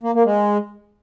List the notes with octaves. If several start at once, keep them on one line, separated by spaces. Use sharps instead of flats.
A#3
A#3
G#3